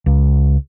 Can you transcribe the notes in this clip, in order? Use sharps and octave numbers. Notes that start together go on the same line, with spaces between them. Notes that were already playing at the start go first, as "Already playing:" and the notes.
C#2